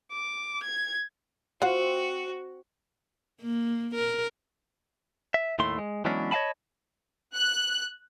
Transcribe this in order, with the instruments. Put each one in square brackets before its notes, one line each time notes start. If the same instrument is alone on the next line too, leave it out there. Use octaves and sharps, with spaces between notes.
[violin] D6
G#6
[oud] C4 [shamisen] F4 F5 F#5 [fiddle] F#4
[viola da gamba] A#3
A#4
[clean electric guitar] E5
D#2 A2 A3 E4 C6
G#3
E3 F#3 G#3 B3 C#4 D4
C#5 D#5 F5 G#5 A5 B5
[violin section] F#6